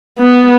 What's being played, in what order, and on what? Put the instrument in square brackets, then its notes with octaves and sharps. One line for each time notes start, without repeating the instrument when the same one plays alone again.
[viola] B3